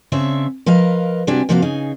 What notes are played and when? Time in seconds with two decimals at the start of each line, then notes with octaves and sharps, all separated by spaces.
0.12 C#3 C4 D4 C#5 E5
0.66 F3 A#4 B4 D#5 F5
1.27 C3 G3 D4 F#4 G4 G#5
1.49 C3 F3 A#3 F#4 D#5 F5
1.62 C#3 D#4 G#4